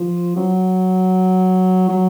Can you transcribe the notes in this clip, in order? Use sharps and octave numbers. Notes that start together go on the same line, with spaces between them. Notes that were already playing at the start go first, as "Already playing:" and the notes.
Already playing: F3
F#3
F#3